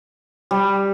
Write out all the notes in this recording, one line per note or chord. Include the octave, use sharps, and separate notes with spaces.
G3